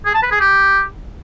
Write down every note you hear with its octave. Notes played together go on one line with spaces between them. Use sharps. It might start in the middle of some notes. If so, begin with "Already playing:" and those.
G#4
A5
B4
G#4
G4